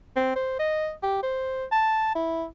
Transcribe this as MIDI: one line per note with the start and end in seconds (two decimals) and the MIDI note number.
0.16 0.34 60
0.35 0.56 72
0.59 0.92 75
1.03 1.19 67
1.23 1.65 72
1.72 2.11 81
2.15 2.45 64